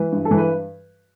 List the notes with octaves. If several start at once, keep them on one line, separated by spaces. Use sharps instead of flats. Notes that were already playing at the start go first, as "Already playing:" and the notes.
Already playing: E3 B4
G2
A4
E3
B4